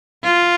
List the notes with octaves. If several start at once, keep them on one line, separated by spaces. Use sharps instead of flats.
F4